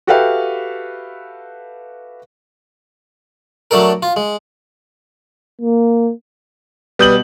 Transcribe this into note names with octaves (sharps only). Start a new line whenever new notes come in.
F#4 G4 A4 B4 E5 F5
F#3 A3 D4 A4 A#4
F4
G#3
A#3
B2 G3 B4 D#6 G6 F#7